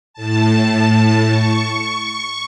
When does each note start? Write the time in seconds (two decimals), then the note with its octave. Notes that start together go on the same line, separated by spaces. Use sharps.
0.14 A2 A5
1.26 C#6